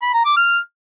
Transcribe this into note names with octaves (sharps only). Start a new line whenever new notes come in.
B5
A#5
D6
F6